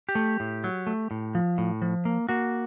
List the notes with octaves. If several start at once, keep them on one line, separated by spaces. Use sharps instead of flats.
G4
A3
A2
F#3
A3
A2
F3
A2
F3
A#3
A#3 F#4